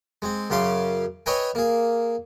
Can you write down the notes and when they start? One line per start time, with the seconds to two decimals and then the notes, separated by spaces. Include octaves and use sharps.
0.22 G#3 C4
0.50 F#2 C#3 C#4 C6 D6
1.26 B4 C#5 D#5 E5 G5 G#5
1.55 A#3 G#4